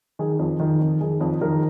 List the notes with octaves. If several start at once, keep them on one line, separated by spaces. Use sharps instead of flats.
D#3 G#4
F2
D#3
F2
D#3 G#4
F2
D#3 A#4